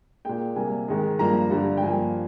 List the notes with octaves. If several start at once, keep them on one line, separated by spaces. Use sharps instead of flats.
A#2 G#3 G5
C3 G3 A#3 G#5
G#2 D#3 G#3
G2 F3 A#3 A#5
G2 D3 G3
G5
G2 F3 A#3 G#5